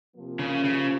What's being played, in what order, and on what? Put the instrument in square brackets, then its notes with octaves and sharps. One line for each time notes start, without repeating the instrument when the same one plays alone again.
[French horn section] C3 F3 A#3
[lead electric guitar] C#3
C#3